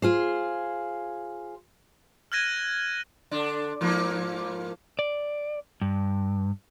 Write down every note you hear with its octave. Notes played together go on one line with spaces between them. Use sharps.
F4 G#4 C5
F6 F#6 G#6 A#6 D#7
D3 D4
G#2 F3 A#3
D5
G2